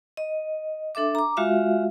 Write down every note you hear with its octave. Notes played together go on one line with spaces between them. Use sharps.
D#5
D4 A4 E5 D6
A#5 D6
G#3 F4 F#4 E5 F5